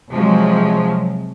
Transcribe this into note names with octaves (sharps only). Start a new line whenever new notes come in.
C3 F3 F#3 G#3